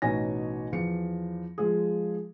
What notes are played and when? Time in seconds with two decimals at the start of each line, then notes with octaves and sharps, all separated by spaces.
0.02 A1 B2 D#4 C#5 G#5 A#6
0.72 E2 F3 C#7
1.58 F3 G#3 F4 G#4